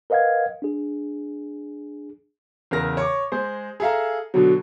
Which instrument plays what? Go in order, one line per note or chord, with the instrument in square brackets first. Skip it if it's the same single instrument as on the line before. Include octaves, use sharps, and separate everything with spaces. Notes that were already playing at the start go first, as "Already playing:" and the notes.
[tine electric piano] A#4 B4 D#5 F5 F#5 G#6
D4 G#4
[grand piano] E2 C#3 A#4 A#6
C#5 C#6 D6
G#3 G#4 C5
G#4 A4 E5 F5 A#5
B2 D3 F#3